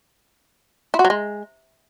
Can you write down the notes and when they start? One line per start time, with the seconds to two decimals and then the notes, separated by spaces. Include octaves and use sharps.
0.94 E4
0.99 F#4
1.05 F#3
1.10 G#3